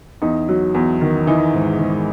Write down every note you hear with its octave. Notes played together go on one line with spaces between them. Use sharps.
E2 D#4
F#3
E2
D#3
E3 D#4
G#2
G#2